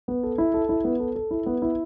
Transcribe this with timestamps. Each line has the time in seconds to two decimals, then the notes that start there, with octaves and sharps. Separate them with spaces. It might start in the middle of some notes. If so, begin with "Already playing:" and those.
0.08 B3
0.23 A4
0.38 E4
0.54 A4
0.69 E4
0.84 B3
1.00 A4
1.16 A4
1.31 E4
1.46 B3
1.62 E4